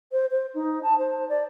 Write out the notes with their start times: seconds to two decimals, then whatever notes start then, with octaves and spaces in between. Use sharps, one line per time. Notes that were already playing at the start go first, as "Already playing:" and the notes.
0.12 C5
0.31 C5
0.54 D#4
0.83 A5
0.98 C5
1.29 D5